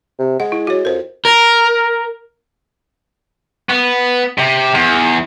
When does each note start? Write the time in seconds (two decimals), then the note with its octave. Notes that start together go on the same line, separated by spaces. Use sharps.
0.19 C3
0.40 G#3 F#5
0.52 E4
0.67 F#4 C#5
0.85 F2 A#4 C5
1.25 A#4
3.69 B3
4.38 C3
4.74 E2